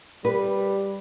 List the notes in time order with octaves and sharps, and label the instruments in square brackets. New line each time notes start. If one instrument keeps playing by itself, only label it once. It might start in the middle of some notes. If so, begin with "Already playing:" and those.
[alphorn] G3 [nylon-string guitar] B4